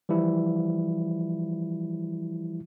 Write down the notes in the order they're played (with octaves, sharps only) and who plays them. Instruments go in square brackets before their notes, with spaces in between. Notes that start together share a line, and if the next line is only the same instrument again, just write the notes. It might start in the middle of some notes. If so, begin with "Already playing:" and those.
[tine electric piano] E3 F3 G3 E4